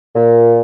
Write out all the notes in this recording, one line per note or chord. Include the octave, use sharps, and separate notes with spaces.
A#2